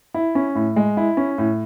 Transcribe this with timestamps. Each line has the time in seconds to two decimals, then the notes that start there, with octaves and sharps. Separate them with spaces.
0.14 E4
0.35 C#4
0.55 A2
0.76 G#3
0.97 E4
1.17 C#4
1.38 A2